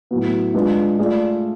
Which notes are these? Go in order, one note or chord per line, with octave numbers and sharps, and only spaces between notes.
A2 F#3 B3
G#3 D4 F4 B4
A3 F4 G#4 D5